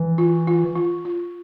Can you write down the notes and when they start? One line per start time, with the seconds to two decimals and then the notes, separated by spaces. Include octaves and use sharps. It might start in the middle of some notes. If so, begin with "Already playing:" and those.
Already playing: E3
0.18 F4
0.47 F4
0.75 F4
1.05 F4